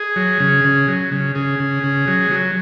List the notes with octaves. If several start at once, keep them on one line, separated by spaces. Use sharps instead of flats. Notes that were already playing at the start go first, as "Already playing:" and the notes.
Already playing: G#4
F#3
C#3
C#3
F#3
C#3
C#3 G#4
C#3
C#3
F#3
F#3